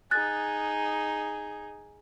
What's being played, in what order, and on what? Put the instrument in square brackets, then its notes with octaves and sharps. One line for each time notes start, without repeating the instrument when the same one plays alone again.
[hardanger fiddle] D#4 G#4 [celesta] F#6 A6